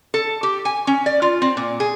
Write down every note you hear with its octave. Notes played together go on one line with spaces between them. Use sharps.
A4
G4
G#5
C#4
D5
F4
C4
A#2
G#4